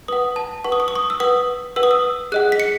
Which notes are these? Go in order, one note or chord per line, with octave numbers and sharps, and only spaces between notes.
B4 F#5 D#6
A5
B4 F#5 C#6
D#6
C#6
D#6
C#6
E6
B4 F#5 D#6
B4 F#5 E6
D#6
E6
G#4 D#5 F#5 F#6
B6
C#7